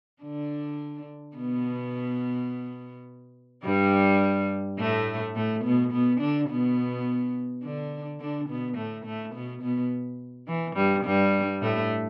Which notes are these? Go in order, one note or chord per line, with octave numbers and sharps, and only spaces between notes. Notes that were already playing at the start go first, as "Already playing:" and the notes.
D3 D4
B2 B3
G2 G3
A2 A3
A2 A3
B2 B3
B2 B3
D3 D4
B2 B3
D3 D4
D3 D4
B2 B3
A2 A3
A2 A3
B2 B3
B2 B3
E3
G2 G3
G2 G3
A2 A3